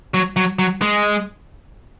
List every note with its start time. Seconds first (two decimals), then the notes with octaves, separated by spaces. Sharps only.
0.14 F#3
0.36 F#3
0.59 F#3
0.82 G#3